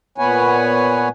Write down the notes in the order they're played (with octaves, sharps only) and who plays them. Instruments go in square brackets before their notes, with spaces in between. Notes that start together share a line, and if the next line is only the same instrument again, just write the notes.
[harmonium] A#2 B3 B4 C#5 F#5 G#5